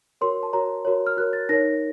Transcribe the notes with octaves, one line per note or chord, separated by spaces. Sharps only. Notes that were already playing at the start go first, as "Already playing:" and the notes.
F#4 A#4 C#5 C6
A5
F#4 A#4 C#5 A#5
F#4 A#4 C#5
F6
F#4 A#4 C#5 F#6
A6
D#4 A#4 C#5 A#6